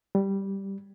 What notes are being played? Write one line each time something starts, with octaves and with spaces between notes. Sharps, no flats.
G3